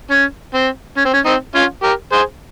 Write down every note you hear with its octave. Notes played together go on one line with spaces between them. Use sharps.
C#4
C4
C#4
C4
C#4
C4 D#4
C#4 F4
G4 A#4
G#4 C5